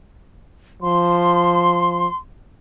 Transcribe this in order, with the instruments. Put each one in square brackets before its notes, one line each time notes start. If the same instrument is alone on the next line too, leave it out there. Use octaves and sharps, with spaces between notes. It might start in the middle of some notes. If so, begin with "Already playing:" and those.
[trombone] F3 [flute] C6